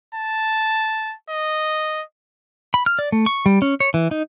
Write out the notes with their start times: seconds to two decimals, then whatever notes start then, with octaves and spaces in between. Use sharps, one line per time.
0.15 A5
1.30 D#5
2.74 B5
2.86 F6
2.99 D5
3.12 A3
3.26 C#6
3.46 G3
3.62 C#4
3.80 C#5
3.94 E3
4.11 D#4